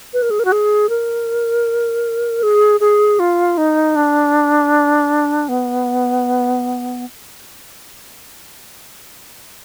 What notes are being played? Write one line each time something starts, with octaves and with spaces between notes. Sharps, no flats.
B4
A#4
G#4
A#4
F#4
G#4
A#4
G#4
G#4
F4
D#4
D4
B3